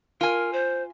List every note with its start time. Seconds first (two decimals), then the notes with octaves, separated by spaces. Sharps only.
0.21 F4 A#4 G#5
0.53 C5